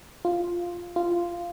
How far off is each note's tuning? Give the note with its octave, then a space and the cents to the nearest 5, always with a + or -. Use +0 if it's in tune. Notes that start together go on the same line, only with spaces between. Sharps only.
F4 +0
F4 -10